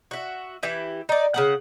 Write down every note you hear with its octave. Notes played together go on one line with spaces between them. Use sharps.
F#4 E5
E3 E4 G4
D#4 D5
C#3 B3 F#5